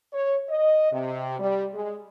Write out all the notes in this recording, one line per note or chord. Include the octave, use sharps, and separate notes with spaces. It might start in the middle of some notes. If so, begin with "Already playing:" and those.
C#5
D#5
C3
G3
G#3